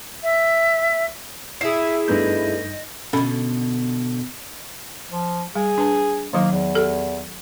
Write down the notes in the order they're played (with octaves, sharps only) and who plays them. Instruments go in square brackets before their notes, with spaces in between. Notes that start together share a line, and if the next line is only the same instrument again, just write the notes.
[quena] E5
[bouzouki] E4 G#4 [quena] E5 [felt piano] C7
[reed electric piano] G2 D#4 G6 [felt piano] A3 B3 D4 [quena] D#5
[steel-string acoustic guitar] B2 D3 [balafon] C#4 A4 B5
[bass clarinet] F3
[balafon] G3 [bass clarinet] G#4
[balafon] D4 B4 A5
[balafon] D#3 F#3 D#4 [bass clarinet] A#3
[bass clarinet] E2
[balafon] G4 A4